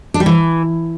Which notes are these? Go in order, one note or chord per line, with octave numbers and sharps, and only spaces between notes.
D4
G3
E3